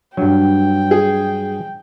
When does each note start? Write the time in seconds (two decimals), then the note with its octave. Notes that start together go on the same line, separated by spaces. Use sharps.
0.17 G2 F#3 D4 G5
0.91 G#4